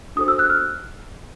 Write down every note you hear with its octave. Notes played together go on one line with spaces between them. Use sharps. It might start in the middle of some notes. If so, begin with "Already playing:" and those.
D4 F#4 A4 C5 D#6
E6
F#6
F6